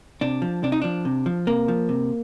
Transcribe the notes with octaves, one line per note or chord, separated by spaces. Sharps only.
C3 D4
F3
C3 D4
D#4
F3 D4
C3
F3
C3 A#3
F3
C3